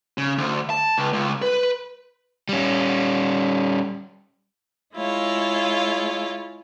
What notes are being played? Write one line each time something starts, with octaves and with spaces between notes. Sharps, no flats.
C#3
D2
A5
C#2
C#2
B4
G3 C#4
G#3 E4 F4 C#5